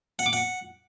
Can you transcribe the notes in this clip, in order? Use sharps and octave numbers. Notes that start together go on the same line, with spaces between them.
F#5
D6
F#5